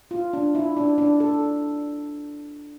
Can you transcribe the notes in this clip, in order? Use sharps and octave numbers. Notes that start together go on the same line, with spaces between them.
F4
D4
E4
D4
D4
A4